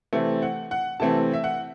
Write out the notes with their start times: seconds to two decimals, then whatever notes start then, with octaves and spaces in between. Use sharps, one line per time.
0.13 C3 E3 A3 C4
0.42 F#5
0.71 F#5
1.00 C3 E3 A3 C4 A5
1.33 E5
1.44 F#5